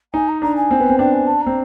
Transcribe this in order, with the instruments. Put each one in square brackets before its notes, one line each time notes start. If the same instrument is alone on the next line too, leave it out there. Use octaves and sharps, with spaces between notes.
[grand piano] D#4 [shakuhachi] G#5
[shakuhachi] A#5
[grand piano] D4 [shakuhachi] A#5
[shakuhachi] G#5
[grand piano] C4
B3
C4
[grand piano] D4 [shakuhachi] G5
[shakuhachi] G#5
A5
[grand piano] C4 [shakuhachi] A#5